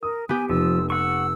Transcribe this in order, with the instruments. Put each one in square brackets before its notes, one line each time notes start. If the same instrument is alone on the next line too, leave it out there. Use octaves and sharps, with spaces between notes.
[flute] A#4 [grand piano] D#6
[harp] B3 G4 [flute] G#5
[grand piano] F1 [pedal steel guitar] F3 [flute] E6
[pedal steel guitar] F#5 C#6 [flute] E6